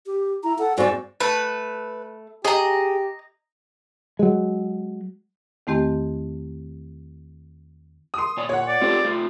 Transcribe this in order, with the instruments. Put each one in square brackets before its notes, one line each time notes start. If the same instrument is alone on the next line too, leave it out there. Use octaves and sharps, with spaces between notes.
[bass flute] G4
[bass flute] E4 [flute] A#5
[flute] A4 [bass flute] F#5
[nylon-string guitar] G#2 C4 [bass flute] F#4 [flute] D5
[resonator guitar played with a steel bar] A3 [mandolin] B4
[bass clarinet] G4 [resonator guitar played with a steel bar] G#4 [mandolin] D#5 A#5
[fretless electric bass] F#3 G#3
[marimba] E2 D#3 A3 C4 G4 D#5
[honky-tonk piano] C6 D#6
[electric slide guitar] A#2 C#5 D5
[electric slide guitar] A#2 [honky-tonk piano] C#5 F#5
[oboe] D5
[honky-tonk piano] C4 [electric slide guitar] F4 G4 A4
[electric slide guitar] A3 F4